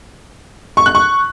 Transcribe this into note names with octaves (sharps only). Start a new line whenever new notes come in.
C#6
F#6
C#6